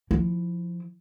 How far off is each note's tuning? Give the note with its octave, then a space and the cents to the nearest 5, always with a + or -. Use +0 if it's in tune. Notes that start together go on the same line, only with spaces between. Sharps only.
F3 -5 E4 +0